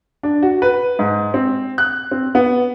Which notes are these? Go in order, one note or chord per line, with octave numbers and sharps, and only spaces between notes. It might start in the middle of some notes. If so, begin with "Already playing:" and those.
D4
F#4
B4
G#2
C4
F#6
C4
B3